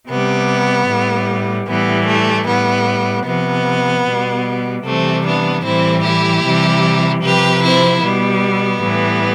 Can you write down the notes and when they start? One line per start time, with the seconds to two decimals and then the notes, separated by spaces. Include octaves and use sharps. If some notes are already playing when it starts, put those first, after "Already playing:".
0.08 C3 G3 B3
0.88 A2 G3
1.67 A2 E3 G3 B3
2.07 A3
2.47 A2 G3 B3
3.25 C3 F3 B3
4.06 B2 G3
4.84 C3 E3 G3 A3 C4
5.24 B3 D4
5.64 A2 E3 G3 C4 E4
6.04 E4 G4
6.43 C3 E3 G3
7.23 C3 F3 G4 B4
7.63 C4 E4
8.02 B2 G3 B3
8.81 A2 E3 G3